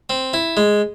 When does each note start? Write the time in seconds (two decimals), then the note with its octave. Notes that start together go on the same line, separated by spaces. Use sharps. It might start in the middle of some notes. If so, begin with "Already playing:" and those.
0.10 C4
0.34 E4
0.57 G#3